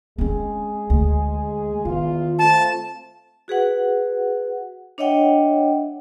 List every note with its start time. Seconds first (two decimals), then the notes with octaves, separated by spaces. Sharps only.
0.18 G#3 C4 C#4 G#4
0.90 D2
1.85 E2 D#3 F4
2.39 A3 C4 F4 A5
3.48 F#4 G#4 B4 F#5
4.98 D4 C#5 D#5 E5 F#5 G5